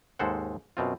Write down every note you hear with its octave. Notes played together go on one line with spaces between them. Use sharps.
D#2 G#2 G#3 A4 C5 F#5
F#2 B2 C4 F4